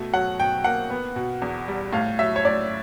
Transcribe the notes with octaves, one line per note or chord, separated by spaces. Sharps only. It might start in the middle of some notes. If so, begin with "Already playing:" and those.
Already playing: B2 A3
F#3 F#5
B2 G5
A#3 F#5
B3
B2
E2
G3
A2 F5
F#3 E5
C#5
A2 D5